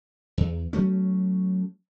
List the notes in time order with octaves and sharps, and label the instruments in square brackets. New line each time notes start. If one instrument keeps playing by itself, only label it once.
[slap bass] E2
F#3 A3 C#4